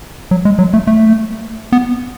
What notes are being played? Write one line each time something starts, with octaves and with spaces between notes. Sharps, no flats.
F#3
G#3
F#3
A3
A3
B3